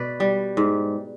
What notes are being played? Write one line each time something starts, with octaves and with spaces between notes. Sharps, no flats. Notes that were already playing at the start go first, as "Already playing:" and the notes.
Already playing: B2 B4 D5
G3
G#2